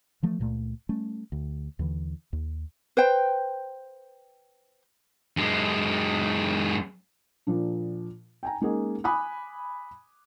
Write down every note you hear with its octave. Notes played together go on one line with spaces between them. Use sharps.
E3 F3 A3
C#2 A#2 A3
G3 A3 C#4
D2
D#2 D3 E3
D#2
B4 C5 G5
F#2 G#3
A#2 F3 D4
G5 G#5 A#5
G#3 A#3 C#4 D#4 G#4
G#5 B5 D6 D#6 F#6